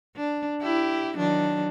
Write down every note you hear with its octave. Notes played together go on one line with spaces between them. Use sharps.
D4
E4 G4
D#3 F#3 D4